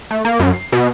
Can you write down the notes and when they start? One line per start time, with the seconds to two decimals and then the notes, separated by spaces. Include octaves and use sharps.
0.11 A3
0.25 A#3
0.39 F#2
0.54 C7
0.72 B2